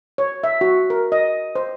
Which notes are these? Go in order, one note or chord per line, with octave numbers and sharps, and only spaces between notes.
C#5
E5
F#4
A#4
D#5
C5